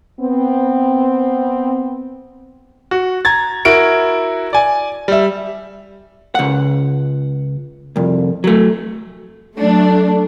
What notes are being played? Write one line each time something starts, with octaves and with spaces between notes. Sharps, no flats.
B3 C4
F#4
A#5 G#6 A6
E4 F#4 A#4 D7
D5 G#5
G3 E5
C#2 F#5
C2 F2
F#3 A3
F#3 A3 D4